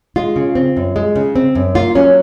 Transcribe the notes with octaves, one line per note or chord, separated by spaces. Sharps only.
G#3 F4
C#3
C4
F#2
G#3
C#3
C4
F#2
A#3 F4
F#3 C#4